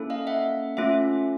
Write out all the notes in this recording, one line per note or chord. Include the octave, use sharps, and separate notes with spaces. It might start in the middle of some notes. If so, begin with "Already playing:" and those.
Already playing: A#3 C#4 E4 A4
D#5 F5
E5 F#5
A3 C#4 F4 A4 E5 F#5